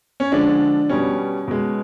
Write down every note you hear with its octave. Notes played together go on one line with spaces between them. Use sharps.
C#4
D3 F3 G#3 D4
B2 G3 C#4
B2 G#3